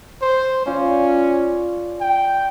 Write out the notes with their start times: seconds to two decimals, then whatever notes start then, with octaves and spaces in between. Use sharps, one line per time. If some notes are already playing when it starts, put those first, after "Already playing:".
0.22 C5
0.66 C#4 F4 D5
2.01 G5